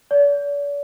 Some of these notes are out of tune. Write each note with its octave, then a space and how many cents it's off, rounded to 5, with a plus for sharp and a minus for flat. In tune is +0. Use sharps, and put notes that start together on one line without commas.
D5 -45